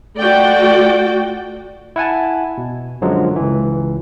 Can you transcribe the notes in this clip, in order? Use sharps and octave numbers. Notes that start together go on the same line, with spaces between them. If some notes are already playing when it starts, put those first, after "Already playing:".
A3 F4 F#4 D5 G5
E4 F#5 G#5 A5
B2
F#2 D3 F3 F#3 G#3
C#2 E3